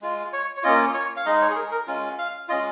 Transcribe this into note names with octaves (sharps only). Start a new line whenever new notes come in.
G#3 F4
C#5
C#5
A#3 C#4 F4 D#5
C#5
F5
G#3 D#4 D#5
C#5
G#4
A#4
A#4
G#3 C#4 F4
F5
G#3 C#4 F4 D#5